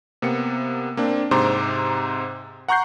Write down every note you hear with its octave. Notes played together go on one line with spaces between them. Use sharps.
C3 A#3 B3 C#7
A#3 C4 D4
G#2 C3 C5 A#5 C6 D6
F#5 A#5 C#6 F#6 G6 C7